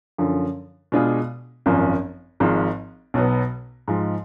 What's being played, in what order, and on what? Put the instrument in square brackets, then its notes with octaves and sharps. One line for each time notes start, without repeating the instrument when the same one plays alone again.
[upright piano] F#2 D3 F3
B2 G#3 D4 F4 G#4
G#1 F#2 F3
G#1 G#2 F3
B1 B2 F#3 B3
G#2 F3 G#3